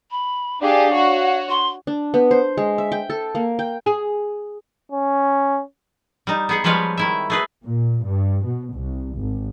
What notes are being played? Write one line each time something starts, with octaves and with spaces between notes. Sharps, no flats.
B5
D4 G4 G#4 F5
F#4 C#5
C6
D4
B3
C5
G#3
E5
G5
A4
A#3
G5
G#4
C#4
G3 D#4
B3 G#4 F#5
F3 G3 G#3 B4 C#5 F5
D#3 E4 E5
A3 G#4 B4
A#2
G2
B2
C2
G#1